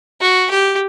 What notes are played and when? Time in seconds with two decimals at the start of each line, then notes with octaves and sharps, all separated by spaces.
0.21 F#4
0.51 G4